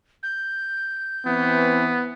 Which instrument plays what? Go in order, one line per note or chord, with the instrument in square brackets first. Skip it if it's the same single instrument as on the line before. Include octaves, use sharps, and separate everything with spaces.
[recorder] G6
[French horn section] E3 C4 [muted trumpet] B3